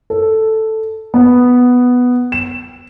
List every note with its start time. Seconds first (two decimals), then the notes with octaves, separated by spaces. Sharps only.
0.10 A4
1.14 B3
2.32 E7